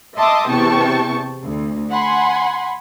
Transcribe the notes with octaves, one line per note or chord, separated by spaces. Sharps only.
D#5 E5 A5 C6 D6 D#6
E2 C3 G5 A5 C#6
D2
F#5 G#5 B5 C6